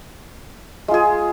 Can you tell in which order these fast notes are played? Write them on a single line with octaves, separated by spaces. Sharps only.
G#3 F4 G#4